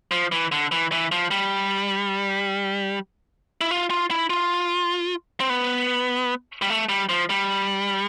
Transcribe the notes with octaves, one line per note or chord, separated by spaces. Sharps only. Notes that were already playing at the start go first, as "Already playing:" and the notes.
F3
E3
D3
E3
E3
F3
G3
E4
F4
F4
E4
F4
C4
B3
G3
A3
G3
F3
G3